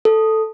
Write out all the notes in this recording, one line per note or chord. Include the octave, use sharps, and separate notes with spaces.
A4